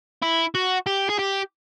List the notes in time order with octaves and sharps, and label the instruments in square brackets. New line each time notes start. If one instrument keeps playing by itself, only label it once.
[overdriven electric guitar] E4
F#4
G4
G#4
G4